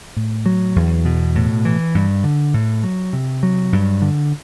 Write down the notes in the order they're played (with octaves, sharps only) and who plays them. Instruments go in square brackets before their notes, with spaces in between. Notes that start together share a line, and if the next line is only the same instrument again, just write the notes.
[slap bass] A2
F#3
E2
B2
A2
E3
G2
D3
A2
F#3
C3
F#3
G2
D3